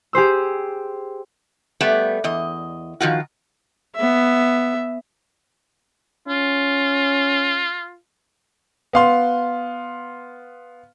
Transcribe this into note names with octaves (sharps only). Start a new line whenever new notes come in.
G4 G#4 C5 E6
G3 A3 B3
E2 D#5
D#3 F3 F4 F#4
B3 E5
C#4 F4
B3 F5 C6